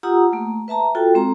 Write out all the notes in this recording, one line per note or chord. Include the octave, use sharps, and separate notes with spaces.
F4 G4 F#5 A#5 D#6 E6
A3 A#3
B4 E5 A5 A#5
F4 F#4 A4 G5
G#3 C4 A#5